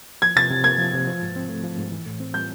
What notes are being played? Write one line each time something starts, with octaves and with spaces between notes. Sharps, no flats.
F3 G#6
C3 A6
C3
A#3 G#6
F3
C3
F3
G#2
C4
A3
F3
G#2
E3
A2
C4
G3 G6